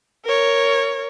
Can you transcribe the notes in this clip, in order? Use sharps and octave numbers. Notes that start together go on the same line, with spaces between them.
A#4 C#5